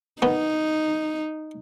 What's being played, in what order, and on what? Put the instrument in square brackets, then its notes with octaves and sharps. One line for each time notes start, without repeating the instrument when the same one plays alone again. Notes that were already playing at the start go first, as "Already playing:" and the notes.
[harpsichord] D#3 B3 [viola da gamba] D#4